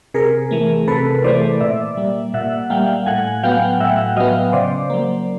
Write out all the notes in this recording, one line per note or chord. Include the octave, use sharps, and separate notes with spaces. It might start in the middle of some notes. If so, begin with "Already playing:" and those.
C3 G#4 A#4
E3 A3
C3 A4 B4
E3 A3 C5 D5
A#2 D5 E5
G3 A#3
A#2 E5 F#5
G3 A#3 F5 G5
A2 F#5 G#5
F#3 B3 F5 G5
A2 E5 F#5
F#3 B3 D#5 F5
C#3 C5 D5
F#3 A#3